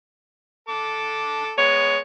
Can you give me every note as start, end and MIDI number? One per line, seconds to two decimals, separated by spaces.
0.69 1.51 69
0.69 1.51 86
1.58 1.97 56
1.58 1.97 59
1.58 1.99 73